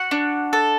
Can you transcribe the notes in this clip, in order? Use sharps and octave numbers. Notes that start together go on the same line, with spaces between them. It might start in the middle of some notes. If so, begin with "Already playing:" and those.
Already playing: F#4 F#5
D4
A4